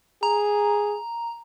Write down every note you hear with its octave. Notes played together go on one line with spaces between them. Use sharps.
G#4 A#5